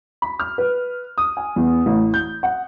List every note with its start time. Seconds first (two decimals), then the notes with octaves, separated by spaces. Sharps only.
0.22 B5
0.40 F6
0.58 B4
1.18 D#6
1.37 G#5
1.56 E2
1.86 A1
2.14 G6
2.43 F#5